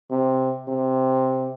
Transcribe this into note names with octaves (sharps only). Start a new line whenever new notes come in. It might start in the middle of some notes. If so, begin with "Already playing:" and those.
C3
C3